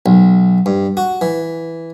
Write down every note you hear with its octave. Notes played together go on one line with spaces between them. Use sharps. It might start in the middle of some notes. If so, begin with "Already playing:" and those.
B1
G2
F#4
E3